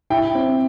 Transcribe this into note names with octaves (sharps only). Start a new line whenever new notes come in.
E4 G5
C4